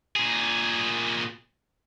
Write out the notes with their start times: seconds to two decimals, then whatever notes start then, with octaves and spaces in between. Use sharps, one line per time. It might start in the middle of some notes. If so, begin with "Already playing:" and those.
0.16 A#2 G#4